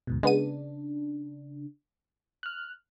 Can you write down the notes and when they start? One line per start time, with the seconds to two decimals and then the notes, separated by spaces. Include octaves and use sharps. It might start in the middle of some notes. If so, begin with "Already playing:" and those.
0.07 D2 G#2 B2
0.23 C#3 G#3 B3 D4 D#7
2.43 F6 F#6